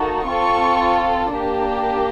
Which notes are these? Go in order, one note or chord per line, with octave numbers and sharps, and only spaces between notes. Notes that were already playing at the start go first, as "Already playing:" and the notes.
Already playing: A#3 D#4 F#4 A4
C4 F4 A4 C#6
A#3 D4 G4